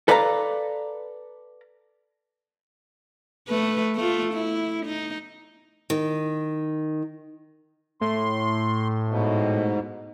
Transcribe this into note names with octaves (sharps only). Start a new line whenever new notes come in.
A4 B4 D5 F5 G5 A#5
A3 B4
A3 F4
E4
D#4
D#3
A2 C6
G#2 B2